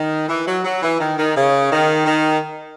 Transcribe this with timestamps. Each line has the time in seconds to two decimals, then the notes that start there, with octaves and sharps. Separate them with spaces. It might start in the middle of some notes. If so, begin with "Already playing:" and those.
Already playing: D#3
0.29 E3
0.47 F#3
0.64 F#3
0.82 E3
1.00 D#3
1.17 D#3
1.36 C#3
1.71 D#3
2.06 D#3